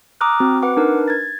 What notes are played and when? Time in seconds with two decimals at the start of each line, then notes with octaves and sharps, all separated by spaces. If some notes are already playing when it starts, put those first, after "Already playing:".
0.21 A#5 D6 D#6 F6 F#6
0.40 C4 F#4
0.63 B4 F#5 D6
0.77 D4 D#4 A#4 B4
1.08 G#6 A6